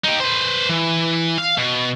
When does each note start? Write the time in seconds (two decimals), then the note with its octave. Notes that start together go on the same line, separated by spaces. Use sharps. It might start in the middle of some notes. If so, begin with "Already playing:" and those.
0.04 D#4 G4
0.20 B4 C5
0.69 E3
1.38 F5
1.58 B2